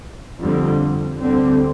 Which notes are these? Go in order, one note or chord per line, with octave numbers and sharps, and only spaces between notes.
F2 D3 G3 C4
D2 D3 G3 C4